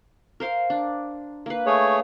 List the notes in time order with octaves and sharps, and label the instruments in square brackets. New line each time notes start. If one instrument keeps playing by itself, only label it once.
[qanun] A#4 C5 F5
D4
A#3 B4
[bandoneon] A3 G#4 C#5